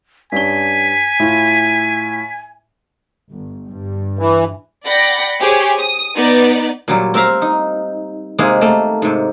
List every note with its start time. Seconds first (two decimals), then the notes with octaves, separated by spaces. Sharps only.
0.32 G2 C#4 G#5 B6 G7
1.20 A2 E4 F4
3.31 G1
3.68 G2
4.19 E3
4.86 D5 F#5 G5 B5 A#6
5.40 G4 G#4 C5 C#5
5.79 D#6
6.16 B3 D#4 D5
6.88 A#2 F#3 G3
7.14 C4 A#4 E5 F5 A#5
7.42 D#4
8.39 C3 G#3 A#3 D#4 G#4
8.61 A3 A#3
9.02 G#2 C3